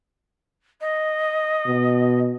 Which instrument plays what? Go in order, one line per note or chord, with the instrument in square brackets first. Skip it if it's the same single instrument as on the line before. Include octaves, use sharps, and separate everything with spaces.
[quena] D#5
[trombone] B2